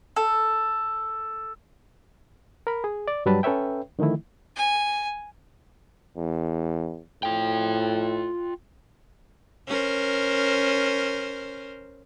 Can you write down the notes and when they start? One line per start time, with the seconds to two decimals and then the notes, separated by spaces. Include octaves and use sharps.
0.16 A4
2.67 A#4 B5
2.84 G#4
3.08 D5
3.26 G2 F#3 G3 B4 A5 B5
3.43 C#4 A4 B4 C#5 E5 G5
3.99 D3 D#3 F3 A3 E4
4.56 G#5
6.17 E2
7.23 A2 F4 G5
9.67 C#4 A#4 C5